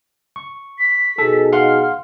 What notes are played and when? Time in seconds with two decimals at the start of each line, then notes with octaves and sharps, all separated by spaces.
0.36 C#6
0.79 B6
1.18 B2 D#4 G#4 A4
1.53 F5 F#5 C6 F6